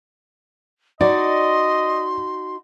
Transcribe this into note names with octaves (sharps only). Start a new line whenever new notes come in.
D#4 F#4 D5 D#5 C6